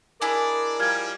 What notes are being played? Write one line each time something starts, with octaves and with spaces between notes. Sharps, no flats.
D4 E4 G#4 A#4 D5 D#5
F3 G3 F6 G#6